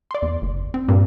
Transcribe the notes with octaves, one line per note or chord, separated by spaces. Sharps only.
D5 C6
E2
F#1
C4
G2 A#2